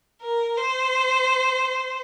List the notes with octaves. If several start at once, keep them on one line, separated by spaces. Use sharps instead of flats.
A#4
C5